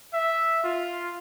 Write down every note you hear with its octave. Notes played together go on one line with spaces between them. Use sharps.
E5
F4